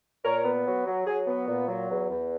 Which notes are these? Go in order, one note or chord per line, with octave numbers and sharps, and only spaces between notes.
A#2 A#4 C#5
B3
F#3
F#3
F#3 G#4
B3
A#2
F#3
E2
E2